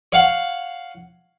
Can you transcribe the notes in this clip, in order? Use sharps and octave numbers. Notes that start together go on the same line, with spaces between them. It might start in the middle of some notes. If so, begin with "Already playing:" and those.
C#5 F5 F#5